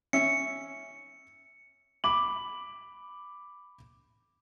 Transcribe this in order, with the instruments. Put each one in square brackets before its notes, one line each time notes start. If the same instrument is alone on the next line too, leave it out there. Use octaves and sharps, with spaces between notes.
[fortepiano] C#4 E5 [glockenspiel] C#7
[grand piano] B5 D6 F#7